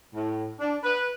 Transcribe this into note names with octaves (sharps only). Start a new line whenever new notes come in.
A2
D4
B4